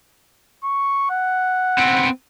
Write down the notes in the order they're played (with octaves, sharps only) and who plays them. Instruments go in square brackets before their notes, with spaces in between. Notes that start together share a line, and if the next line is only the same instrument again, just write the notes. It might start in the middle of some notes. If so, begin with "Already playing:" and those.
[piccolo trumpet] C#6
F#5
[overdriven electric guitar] B3 C4